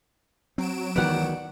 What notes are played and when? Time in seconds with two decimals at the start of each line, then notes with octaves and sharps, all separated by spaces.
0.58 F#3 C4 D7 E7
0.96 D2 D#3 E3 G#3 B3 D5 F#5